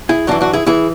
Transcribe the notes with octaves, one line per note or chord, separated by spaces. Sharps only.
E4 G#4
F#2 E3 D4 F#4
D4 F#4
E4 G#4
E3 E4 G#4